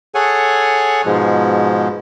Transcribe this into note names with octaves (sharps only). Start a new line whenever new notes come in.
G#4 A4 C#5 F#5 G#5
G#2 B2 F3 G#3